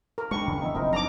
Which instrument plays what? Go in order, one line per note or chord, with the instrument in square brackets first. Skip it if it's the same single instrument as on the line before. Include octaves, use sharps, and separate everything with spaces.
[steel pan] A#4
[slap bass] G#3 [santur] D4 G5 B5 [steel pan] C#6
[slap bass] C#3 E3
[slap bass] D#3 B3 [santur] D#4 E4
[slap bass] F#1 F3 C4 [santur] D#4 A#4 C5
[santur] D4 D5 A5 [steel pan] A#5 D6